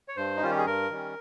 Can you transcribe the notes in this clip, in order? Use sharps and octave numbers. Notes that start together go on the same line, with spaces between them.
C#5
G2 C5
D#4
D#3 G3 C#4 F4
G4
G#4
G2 A#4
D#3 G3 C#4